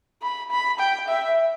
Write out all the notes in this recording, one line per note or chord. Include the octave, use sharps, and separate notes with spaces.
B5
B5
G5
E5